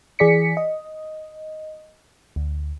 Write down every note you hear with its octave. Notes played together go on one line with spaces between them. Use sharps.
E3 G#4 D5 B6 C#7
D#5
D2